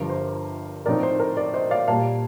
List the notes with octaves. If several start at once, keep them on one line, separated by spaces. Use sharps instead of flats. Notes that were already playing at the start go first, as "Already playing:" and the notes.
Already playing: G1 G2 F3 A#4
C5
A2 F3 C4 D#4 A#4 D5
C5
A#4
A#4 D5
C5 D#5
D5 F5
A#2 G3 A#3 F5 A5